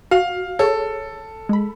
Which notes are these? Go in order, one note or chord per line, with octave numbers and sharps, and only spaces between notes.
F#4 F5
G#4 A4 C#5
G#3 B5